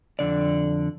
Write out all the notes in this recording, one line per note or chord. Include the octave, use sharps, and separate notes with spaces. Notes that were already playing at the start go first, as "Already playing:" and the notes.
F2 D3 D5